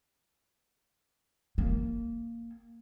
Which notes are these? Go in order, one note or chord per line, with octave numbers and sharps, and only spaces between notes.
A#3